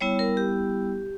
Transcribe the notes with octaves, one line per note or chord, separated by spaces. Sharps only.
G3 B3 E4 C#5
A#4
G4